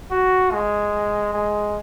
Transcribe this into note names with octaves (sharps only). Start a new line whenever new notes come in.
F#4
G#3
G#3